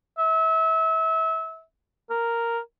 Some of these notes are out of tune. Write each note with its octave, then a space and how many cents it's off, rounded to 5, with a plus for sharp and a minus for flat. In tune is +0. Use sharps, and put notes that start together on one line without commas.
E5 -30
A#4 -5